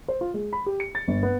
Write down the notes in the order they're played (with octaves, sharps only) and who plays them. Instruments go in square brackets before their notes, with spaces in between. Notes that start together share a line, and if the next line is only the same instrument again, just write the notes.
[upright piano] C5
F4
G#3
B5
G4
C#7
A6
G1
B3